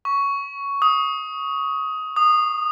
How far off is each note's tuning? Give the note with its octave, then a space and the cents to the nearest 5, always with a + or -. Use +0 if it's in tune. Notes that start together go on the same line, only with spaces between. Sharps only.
C#6 +10
D#6 +15
D#6 -20